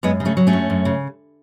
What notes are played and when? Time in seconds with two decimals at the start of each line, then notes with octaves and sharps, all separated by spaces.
0.03 F#2 G#3 B3
0.20 C#3
0.25 A3 C#4
0.37 F#3
0.47 A3 C#4
0.53 F#2
0.70 F#2
0.85 C#3